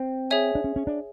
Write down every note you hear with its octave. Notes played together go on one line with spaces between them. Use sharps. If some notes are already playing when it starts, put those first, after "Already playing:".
Already playing: C4
G#4 C#5 E5 G#5
D4
C#4
C#4
D4